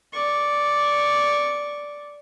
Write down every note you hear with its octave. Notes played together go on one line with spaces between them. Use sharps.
D5 C#6